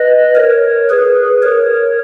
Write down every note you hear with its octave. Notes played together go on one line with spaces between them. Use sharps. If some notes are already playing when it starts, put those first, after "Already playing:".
Already playing: B4 D#5
A#4 C#5
G#4 B4
A#4 C#5